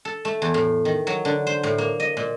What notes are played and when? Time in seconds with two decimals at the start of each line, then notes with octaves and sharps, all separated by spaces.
0.05 A4
0.25 A3
0.42 E2
0.54 A2
0.85 D#3
1.07 F#3
1.25 D3
1.47 C5
1.63 A2
1.78 A#3
2.00 D#5
2.17 A#2